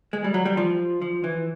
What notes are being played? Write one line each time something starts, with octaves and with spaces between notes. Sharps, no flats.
G#3
G3
F#3
G3
F3
F3
E3